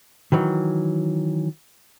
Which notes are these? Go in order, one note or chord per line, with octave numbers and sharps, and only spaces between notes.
D#3 E3 F#3